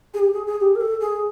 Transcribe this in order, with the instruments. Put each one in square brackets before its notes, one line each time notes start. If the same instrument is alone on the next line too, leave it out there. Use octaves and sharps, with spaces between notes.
[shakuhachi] G#4
G4
G#4
G#4
G4
A#4
A4
G#4